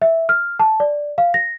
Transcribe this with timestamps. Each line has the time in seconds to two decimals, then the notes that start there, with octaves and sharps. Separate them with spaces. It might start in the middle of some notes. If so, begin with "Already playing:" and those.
0.02 E5
0.29 F6
0.60 A5
0.80 D5
1.18 F5
1.34 A#6